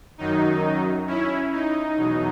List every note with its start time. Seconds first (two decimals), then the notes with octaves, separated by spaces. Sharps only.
0.18 F#2 D#3 F#3 D#4
1.07 C#4 E4
1.52 D#4
1.96 E2 B2 F#3